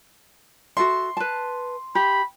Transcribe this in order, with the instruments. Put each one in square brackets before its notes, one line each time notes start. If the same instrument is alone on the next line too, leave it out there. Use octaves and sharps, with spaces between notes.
[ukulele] F#4 A4 E5 [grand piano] C6
[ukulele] B4 A5
[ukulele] G4 [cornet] B5